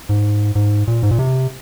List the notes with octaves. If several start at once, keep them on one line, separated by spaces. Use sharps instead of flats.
G#2
G#2
A#2
G#2
A#2
C3